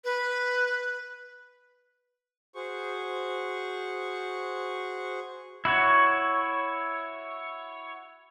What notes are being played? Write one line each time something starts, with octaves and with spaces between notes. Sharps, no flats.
B4
F#4 G#4 C5 C#6
E4 F#4 C#5